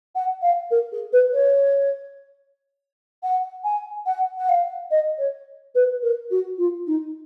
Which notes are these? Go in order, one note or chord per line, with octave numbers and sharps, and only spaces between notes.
F#5
F5
A#4
G#4
B4
C#5
F#5
G#5
F#5
F#5
F5
D#5
C#5
B4
A#4
F#4
F4
D#4